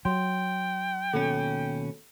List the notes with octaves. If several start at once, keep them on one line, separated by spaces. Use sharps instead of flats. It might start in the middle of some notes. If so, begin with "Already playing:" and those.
F#3 G5 C6
D#2 B2 C#4 A4